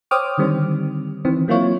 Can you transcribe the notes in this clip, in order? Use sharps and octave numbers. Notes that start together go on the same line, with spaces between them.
C5 C#5 G5 D6 D#6 F6
D3 D#3 G3 C4
D#3 E3 C4
F#3 A#3 E4 F4 C#5